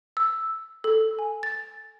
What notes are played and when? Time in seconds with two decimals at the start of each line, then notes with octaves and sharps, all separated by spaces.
0.17 E6
0.84 A4
1.19 G#5
1.43 A6